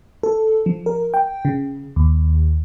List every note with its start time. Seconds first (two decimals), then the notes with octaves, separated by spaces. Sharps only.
0.23 A4
0.66 F3
0.86 A#4
1.14 G5
1.45 C#3
1.96 D#2